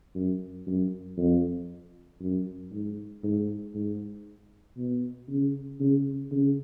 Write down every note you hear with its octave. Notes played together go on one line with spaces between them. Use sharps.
F#2
F#2
F2
F#2
G#2
G#2
G#2
B2
C#3
C#3
C#3